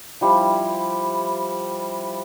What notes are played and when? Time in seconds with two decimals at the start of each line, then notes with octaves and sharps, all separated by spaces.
0.21 F3 G3 E4